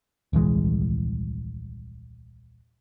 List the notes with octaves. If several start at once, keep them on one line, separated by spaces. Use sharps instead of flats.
D#1 C2 E3 G#3